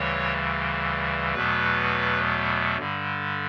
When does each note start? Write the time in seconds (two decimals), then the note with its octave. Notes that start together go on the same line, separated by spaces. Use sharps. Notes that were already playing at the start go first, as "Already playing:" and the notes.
Already playing: D2 C#3 E3 G3 C#5
1.34 E2 B2 F#3 A3 B4
2.78 G2 D3 G3